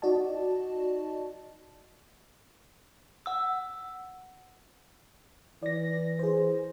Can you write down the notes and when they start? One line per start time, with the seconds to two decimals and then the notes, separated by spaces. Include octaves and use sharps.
0.02 D#4 F#4 D5 D#5 A5
3.26 F#5 E6
5.63 E3 D5 A#6
6.19 G#4 C5